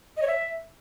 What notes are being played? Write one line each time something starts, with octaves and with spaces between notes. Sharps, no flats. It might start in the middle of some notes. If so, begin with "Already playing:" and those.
D#5
C#5
E5